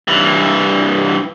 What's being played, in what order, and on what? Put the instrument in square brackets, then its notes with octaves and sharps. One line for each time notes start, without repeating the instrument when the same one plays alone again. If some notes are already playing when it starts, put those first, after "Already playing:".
[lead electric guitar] G2 E3